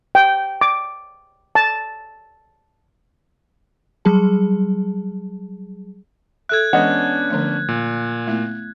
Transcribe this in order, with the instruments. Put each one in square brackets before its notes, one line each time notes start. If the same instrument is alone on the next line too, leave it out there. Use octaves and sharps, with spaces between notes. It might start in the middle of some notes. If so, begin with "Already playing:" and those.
[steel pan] G5
D6
A5
[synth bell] F#3 G3 G#4 A5
[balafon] A4 E5 [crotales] F#6 G#6
[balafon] E3 G#3 [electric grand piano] B3 C#4 D4 [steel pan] D#5 F#5
[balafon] D3 F3 A3
[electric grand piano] A#2
[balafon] A3 B3 E4